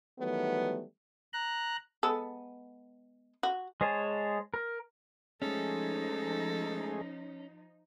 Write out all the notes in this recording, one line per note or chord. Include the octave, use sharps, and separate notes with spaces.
D#3 E3 F#3 G3 A3 B3
A#5 F#6
G#3 B3 A4
F#4
G#3 C5 C#5 G#5 A5
A#4
F3 G#3 A3 C#4 D#4 G#4 A4